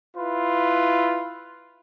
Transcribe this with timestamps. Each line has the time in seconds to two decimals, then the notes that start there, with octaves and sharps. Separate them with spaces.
0.17 E4 F4 B4